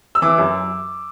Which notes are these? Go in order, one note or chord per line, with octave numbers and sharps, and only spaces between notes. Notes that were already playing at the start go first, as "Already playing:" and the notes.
E6
E3 D6
F#2